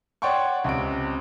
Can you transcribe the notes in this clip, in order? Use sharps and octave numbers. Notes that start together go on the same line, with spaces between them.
C#5 D5 F#5 G5 C6 C#6
C#2 C3 D7